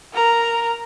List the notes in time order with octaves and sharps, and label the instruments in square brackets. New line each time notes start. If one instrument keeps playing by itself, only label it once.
[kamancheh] A#4 A#5